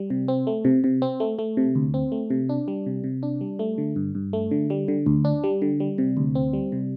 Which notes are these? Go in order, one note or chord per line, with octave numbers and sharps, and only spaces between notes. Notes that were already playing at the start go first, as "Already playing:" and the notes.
Already playing: G3
C3
C4
A3
C3
C3
C4
A3
A3
C3
D2
C4
A3
C3
D4
G3
C3
C3
D4
G3
A3
D3
G2
G2
A3
D3
G3
D3
D2
D4
G3
D3
G3
C3
D2
C4
G3
C3